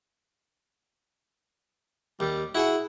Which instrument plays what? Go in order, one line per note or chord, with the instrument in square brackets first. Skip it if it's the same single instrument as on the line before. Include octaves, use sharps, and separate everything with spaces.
[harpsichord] D#2 [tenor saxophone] G3
[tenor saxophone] E4 [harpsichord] F#4 G#4 F#5